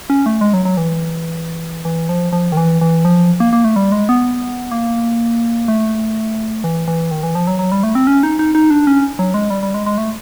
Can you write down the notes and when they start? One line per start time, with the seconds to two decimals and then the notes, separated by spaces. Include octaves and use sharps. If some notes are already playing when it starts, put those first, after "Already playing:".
0.10 C#4
0.26 A3
0.41 G#3
0.53 F#3
0.65 F#3
0.77 E3
1.85 E3
2.09 F3
2.33 F3
2.52 D#3
2.57 E3
2.81 E3
3.05 F3
3.40 A#3
3.53 A#3
3.64 A3
3.76 G3
3.92 G#3
4.09 B3
4.72 A#3
5.68 A3
6.64 E3
6.88 E3
7.11 D#3
7.23 E3
7.35 F3
7.47 F#3
7.59 F#3
7.72 G3
7.83 A3
7.95 C4
8.07 C#4
8.23 D#4
8.39 D#4
8.55 D#4
8.70 D4
8.87 C#4
9.19 F#3
9.34 G#3
9.50 G3
9.63 G3
9.74 G#3
9.86 G#3
9.98 A3